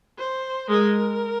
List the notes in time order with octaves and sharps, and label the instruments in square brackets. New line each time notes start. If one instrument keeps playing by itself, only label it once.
[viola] C5
[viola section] G#3 [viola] A#4